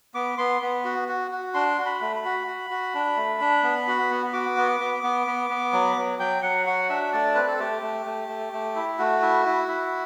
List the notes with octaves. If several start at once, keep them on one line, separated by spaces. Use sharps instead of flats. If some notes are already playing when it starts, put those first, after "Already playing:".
B3 D6
B3 C6
B3
F#4
F#4
F#4
D4 C6
F#4
B5
A3
B5
F#4
F#4
F#4
D4
A3
D4
B3
F#4
B3
F#4 D6
B3
B3
B3
B3
B3
F#3
F#3
F#3 G5
F#3 F#5
F#4 F#5
D4 E5
A3 D5
C4 B4
A4
A3 G4
A3
A3
A3
A3
E4
A3 F#4
E4
E4
E4